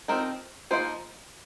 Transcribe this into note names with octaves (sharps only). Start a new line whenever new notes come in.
F3 C4 D#4 A#4
F3 A#3 D#4 C5